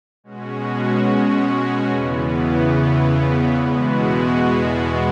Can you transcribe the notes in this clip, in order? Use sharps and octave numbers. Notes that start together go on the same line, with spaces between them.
B2 G#3 C#4 F#4
E2 C#3 E3 B3
E2 B2 G#3 B3 F#4